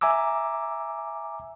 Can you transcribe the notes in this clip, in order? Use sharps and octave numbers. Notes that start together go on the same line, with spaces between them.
E5 G#5 A#5 D6 E6